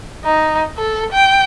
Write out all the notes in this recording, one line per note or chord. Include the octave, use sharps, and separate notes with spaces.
D#4
A4
G5